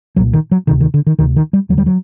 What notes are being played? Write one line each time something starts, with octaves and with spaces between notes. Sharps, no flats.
C2 A#2 F#3
D#3
F#3
D2 C3 D#3
D#3
D3
D#3
D2 C3 D#3
D#3
G3
D#2 D3 F#3 G3
F#3